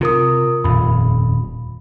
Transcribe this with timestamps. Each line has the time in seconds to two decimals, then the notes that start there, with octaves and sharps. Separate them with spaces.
0.01 C3 F4 A#4 D#6
0.64 D#1 F2 B5